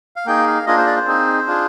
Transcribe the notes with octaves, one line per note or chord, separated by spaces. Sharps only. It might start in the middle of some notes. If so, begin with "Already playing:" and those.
F5
A#3 D#4 G#4 G5
F5
A#3 D4 F4 G#4 D#5
C5
D5
C5
C4 D#4 G#4
D4 F4 G#4